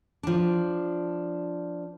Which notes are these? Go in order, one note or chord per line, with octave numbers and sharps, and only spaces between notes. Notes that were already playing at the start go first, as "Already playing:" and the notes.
F3 D4